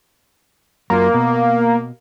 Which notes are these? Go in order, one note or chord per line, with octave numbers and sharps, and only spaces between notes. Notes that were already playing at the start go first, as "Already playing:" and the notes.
F#2 A#3 F4
B2